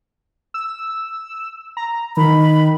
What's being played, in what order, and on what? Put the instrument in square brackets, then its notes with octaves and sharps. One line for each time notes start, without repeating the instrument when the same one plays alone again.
[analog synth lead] E6
A#5
[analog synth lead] D#3 [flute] B5